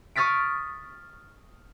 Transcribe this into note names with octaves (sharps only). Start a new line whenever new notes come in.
C#6 D#6 F6 A6 B6 D7